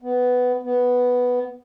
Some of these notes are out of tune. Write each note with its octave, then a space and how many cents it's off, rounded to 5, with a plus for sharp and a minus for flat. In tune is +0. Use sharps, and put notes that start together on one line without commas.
B3 +10
B3 +0